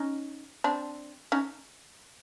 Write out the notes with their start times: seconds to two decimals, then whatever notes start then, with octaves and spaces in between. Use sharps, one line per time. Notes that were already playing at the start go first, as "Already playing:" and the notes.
Already playing: C#4 D#4
0.64 C4 D4
1.32 C#4 D#4